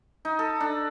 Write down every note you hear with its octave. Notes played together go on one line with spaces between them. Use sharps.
D#4
A4
D4